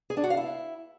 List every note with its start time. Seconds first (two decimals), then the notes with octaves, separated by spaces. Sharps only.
0.10 G#4
0.17 D4
0.24 F#4
0.30 F5
0.37 E4